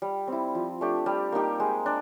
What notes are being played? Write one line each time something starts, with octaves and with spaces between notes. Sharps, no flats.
G3
C4 E4
F3
A3 D4 G4
G3
A#3 D#4 G4
G#3
D4